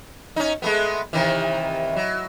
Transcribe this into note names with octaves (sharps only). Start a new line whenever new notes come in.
C#4 D#4
G#3 A3 B3
C3 D#3 E3
F#3